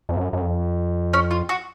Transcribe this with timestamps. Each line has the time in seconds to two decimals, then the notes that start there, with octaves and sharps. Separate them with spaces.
0.09 F2
0.17 F#2
0.33 F#2
0.42 F2
1.14 C#4
1.31 F4
1.49 F#4